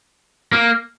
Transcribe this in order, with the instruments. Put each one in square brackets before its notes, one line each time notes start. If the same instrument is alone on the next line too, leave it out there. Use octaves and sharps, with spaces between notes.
[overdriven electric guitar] A#3